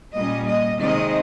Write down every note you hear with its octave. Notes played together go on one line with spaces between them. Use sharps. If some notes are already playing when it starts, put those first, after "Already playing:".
A#2 G3 A#3 C#4 D#5
D#5
C3 D#3 G#3 C4 D#5